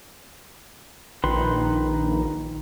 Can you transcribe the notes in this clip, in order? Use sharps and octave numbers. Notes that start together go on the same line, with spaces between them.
A#1 D#3 B4 C6